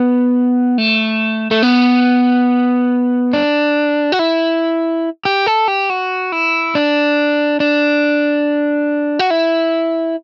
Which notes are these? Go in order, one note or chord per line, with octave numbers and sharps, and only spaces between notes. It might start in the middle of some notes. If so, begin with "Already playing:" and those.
Already playing: B3
A3
A3
B3
D4
F#4
E4
G4
A4
G4
F#4
E4
D4
D4
F#4
E4